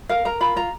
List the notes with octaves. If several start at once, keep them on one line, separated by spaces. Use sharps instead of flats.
A#4 F5
A#4 A#5
F4 B5
F4 A#5